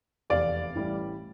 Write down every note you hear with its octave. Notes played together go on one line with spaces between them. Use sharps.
F1 E2 C3 D5 F5
A1 A2 E3 G3